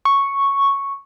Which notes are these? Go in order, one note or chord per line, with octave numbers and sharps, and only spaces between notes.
C#6